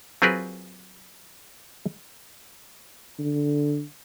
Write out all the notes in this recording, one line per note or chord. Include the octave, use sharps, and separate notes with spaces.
F#3 C4 F4 G#4 A#4 B4
D3